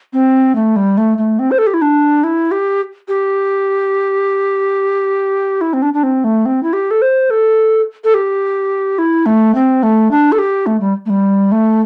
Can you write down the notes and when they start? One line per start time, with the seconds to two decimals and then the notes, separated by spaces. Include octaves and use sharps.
0.13 C4
0.55 A3
0.76 G3
0.97 A3
1.18 A3
1.39 C4
1.51 C5
1.58 A4
1.66 G4
1.74 E4
1.81 D4
2.23 E4
2.51 G4
3.08 G4
5.61 E4
5.73 C4
5.82 D4
5.94 D4
6.03 C4
6.24 A3
6.45 C4
6.63 E4
6.73 G4
6.91 A4
7.02 C5
7.30 A4
8.04 A4
8.14 G4
8.98 E4
9.26 A3
9.55 C4
9.83 A3
10.11 D4
10.32 A4
10.38 G4
10.66 A3
10.80 G3
11.06 A3
11.10 G3
11.52 A3